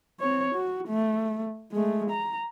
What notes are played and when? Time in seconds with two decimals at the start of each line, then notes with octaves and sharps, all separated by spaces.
0.20 C4 C#5
0.55 F#4
0.88 A3
1.72 G#3 A3
2.10 A#5